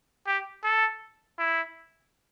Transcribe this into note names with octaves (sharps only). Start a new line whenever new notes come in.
G4
A4
E4